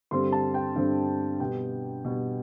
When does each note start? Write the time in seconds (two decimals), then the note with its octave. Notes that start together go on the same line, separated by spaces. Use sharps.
0.11 G2 D3 G3 C4 C6
0.32 A5
0.54 G5
0.76 G2 D3 G3 C4
1.40 B2 G3 B3 G5
2.05 B2 G3 B3